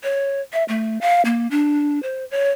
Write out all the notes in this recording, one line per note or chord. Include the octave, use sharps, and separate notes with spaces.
C#5
E5
A3
F5
A#3
D4
C5
C#5